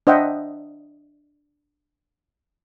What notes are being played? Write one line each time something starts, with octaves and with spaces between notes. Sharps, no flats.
D4 C5 D#5 E5 F#5 G5